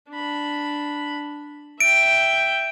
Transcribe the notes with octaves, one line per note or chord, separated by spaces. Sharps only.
D4 B5
E5 G5 D7